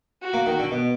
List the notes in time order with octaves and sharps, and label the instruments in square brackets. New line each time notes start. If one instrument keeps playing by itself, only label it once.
[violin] F#4
[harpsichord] A#3
D#3
D3
B2